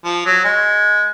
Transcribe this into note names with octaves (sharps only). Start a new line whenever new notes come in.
F3
F#3
G#3